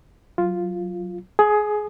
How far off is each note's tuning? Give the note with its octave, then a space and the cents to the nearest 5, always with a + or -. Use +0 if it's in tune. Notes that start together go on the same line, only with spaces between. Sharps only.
F#3 +0 F4 +0
G#4 +20 D#6 -20